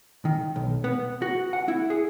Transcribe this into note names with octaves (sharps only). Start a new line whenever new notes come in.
D#3
B1
B3
F#4
F#5
E4
G#4